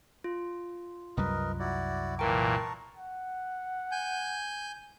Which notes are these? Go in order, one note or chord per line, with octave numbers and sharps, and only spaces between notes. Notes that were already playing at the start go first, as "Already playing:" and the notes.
F4
C2 F#2 G3 A#4 B4 D#5
E4 F#4 D5
A#2 E3 A#4 G5 A5 A#5 C#6
F#5
G#5 G6